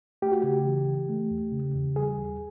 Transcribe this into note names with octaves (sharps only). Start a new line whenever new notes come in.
A3 G4
F#4
C#3 G4
E3
E3
A3
E2
C#3
E2
G3 G#4
D#2